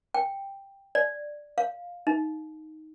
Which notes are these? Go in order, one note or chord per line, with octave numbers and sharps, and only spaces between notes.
G5
D5
F5
D#4